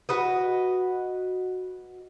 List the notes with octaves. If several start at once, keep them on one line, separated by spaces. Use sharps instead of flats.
F#4 B4 D#5